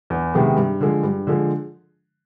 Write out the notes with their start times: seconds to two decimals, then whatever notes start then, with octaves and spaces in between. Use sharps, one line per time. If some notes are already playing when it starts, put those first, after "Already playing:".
0.10 E2
0.33 C3 D#3 G#3 B3
0.56 G2
0.81 D3 F3 G#3
1.03 G2
1.27 D3 F3 G#3